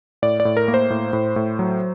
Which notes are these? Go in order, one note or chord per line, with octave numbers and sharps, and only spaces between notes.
A2 D5
D5
A2
A#4
A#3
C5
A2
A2
A2
F#3